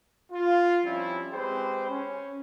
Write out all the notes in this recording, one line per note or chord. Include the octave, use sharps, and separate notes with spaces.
F4
F3 G3 C4 C#4 E4
G#3 C4 G4 G#4 B4 C5
C#4